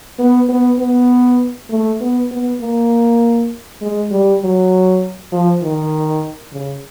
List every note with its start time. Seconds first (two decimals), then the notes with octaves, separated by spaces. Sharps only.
0.19 B3
0.49 B3
0.79 B3
1.70 A3
2.01 B3
2.31 B3
2.61 A#3
3.81 G#3
4.11 G3
4.42 F#3
5.32 F3
5.62 D#3
6.52 C#3